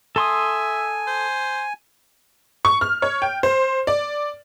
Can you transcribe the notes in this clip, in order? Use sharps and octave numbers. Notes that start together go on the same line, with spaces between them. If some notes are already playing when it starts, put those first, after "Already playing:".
A4 E5 G#5 C6 D#6
C5
C#6
F6
C#5
G5
C5
D5